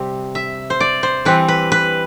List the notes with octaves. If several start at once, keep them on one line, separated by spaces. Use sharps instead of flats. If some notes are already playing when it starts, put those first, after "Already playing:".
Already playing: C3 G3 C4
E5
C5
D5
C5
E3 G3 C4 B4
B4
B4